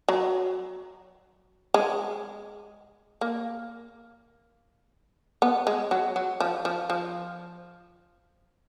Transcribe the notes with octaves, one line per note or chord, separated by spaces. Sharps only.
F#3
G#3
A#3
B3
G#3
F#3
F#3
F3
F3
F3